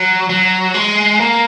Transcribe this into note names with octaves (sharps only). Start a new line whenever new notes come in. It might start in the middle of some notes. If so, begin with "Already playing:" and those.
Already playing: F#3
F#3
G#3
A#3